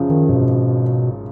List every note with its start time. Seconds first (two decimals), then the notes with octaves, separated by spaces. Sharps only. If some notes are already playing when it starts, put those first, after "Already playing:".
Already playing: F#2 C#3 F3
0.10 D#3
0.29 G#1 B2